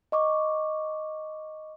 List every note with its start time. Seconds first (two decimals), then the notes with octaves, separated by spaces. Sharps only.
0.12 D#5 C#6 D6